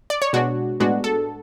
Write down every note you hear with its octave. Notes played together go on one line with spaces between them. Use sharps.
D5
C#5
B2 G#3 D4 F#4
A2 G#3 B3 D4 F#4
A4